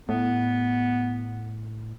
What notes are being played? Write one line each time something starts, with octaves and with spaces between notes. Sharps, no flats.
A2 B3